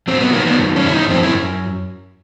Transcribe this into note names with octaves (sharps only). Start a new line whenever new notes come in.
F#3 C4
B3
D#3 A#3
B3
F#2
C#4
F#2 E4
D#4
F#2 C4
E4